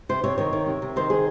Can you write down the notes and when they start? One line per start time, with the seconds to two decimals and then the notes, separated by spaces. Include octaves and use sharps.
0.09 C3 C5
0.24 C3 C#5
0.38 D#3 C#5
0.53 D#3
0.66 C3
0.82 C3
0.96 D#3 C5
1.10 D#3 G#4